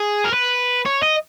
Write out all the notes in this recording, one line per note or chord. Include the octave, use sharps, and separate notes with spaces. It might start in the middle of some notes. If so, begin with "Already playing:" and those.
Already playing: G#4
A#4
B4
C#5
D#5